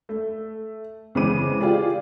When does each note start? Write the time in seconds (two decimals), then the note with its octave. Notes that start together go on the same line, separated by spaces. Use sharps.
0.09 A3
1.15 C#3 E3 G#3 C4 D6 D#7
1.60 F4 G4 G#4 D5